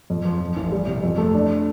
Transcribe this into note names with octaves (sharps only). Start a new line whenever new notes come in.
F2
F3
F3
A1
G3
C3
F2
A3
D4